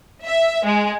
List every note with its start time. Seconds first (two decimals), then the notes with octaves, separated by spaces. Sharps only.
0.23 E5
0.64 G#3